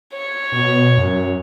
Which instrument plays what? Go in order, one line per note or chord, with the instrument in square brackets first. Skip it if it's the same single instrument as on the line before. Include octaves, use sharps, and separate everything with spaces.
[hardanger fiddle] C#5
[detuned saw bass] B2
F#2